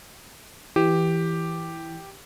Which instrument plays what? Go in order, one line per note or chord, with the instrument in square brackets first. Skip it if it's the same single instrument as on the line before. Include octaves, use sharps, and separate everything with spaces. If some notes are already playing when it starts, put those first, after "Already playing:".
[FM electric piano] E3 [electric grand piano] G4